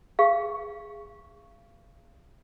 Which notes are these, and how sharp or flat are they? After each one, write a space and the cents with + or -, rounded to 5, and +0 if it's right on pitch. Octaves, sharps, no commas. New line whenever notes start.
G#4 -10 F5 -30 C#6 +0